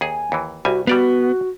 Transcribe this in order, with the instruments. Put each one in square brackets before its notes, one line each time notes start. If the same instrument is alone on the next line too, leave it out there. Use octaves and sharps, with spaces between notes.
[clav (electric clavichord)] D#2 G#4 [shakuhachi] G#5
[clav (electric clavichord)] D#2 E3
[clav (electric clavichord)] C2 G3 G#5 [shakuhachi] F#4
[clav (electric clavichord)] G3 D5 F5 [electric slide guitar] B3 [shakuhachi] F#4